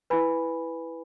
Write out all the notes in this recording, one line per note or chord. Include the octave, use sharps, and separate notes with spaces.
E4 B4 G#5 B5